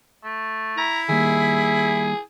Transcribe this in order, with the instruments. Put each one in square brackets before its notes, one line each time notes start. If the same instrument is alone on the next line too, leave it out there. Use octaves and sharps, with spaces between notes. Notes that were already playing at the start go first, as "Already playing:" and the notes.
[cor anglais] A3
[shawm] E4 [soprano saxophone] A#5
[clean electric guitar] D#3 G3 A#3 [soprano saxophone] G#4 [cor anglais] E5